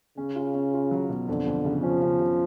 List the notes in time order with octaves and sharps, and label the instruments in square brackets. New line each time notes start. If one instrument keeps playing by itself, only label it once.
[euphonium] C#3 [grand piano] C#4
[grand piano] F4
C#4
F4
F#3
B2
[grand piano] F2 [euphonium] D3
[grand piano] F2
C#3
[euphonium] F3 [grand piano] C#4
[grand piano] C#3
C#3